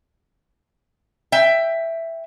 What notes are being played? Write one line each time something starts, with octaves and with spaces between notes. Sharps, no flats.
E5 G5